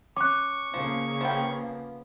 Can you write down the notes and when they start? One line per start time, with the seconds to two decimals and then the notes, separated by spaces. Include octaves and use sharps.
0.17 C#4 C#6 D6 F#6
0.74 C#3 F3 A#3
1.21 F3 B3 G5